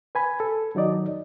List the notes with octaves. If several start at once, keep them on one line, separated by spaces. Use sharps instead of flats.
B4 G#5 B5
A4
D#3 F#3 D#4 D5 D#5